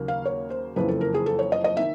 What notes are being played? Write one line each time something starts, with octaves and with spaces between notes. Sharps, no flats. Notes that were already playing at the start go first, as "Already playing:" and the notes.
Already playing: D#2 C#3 F#3 A#3
F5
C#5
C5
F#1 F2 C#3 E3 B4
A4
A#4
G#4
A4
C#5
D#5
D#5
D#3 E5